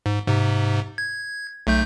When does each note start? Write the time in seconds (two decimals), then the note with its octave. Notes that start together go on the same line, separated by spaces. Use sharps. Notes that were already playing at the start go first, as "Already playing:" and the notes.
0.06 G#2
0.27 G#2 C3
0.98 G#6
1.67 B1 A3 G6